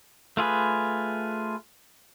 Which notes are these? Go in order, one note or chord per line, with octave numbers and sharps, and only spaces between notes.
A3 F4 G#4 B4